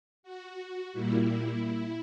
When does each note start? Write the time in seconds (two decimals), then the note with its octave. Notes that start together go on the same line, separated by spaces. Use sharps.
0.23 F#4
0.93 A#2 G3 A#3 E4